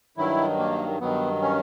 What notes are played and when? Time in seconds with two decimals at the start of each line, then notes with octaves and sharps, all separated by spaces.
0.17 G2 D#3 F#3 E4
0.59 A#3
1.00 G2 D#3 F#3 B3
1.42 C#4